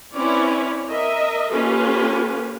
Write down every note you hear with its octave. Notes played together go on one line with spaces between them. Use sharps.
C4 C#4 E4 B4 C#5 D5
A#4 D#5 E5
A#3 C#4 F4 G4 A4 B4